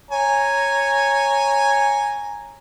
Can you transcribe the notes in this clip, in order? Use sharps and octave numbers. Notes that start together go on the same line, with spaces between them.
C#5 G#5 A#5